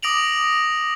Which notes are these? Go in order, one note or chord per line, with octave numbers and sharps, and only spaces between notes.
D6 D#6 A#6 D7 F7 F#7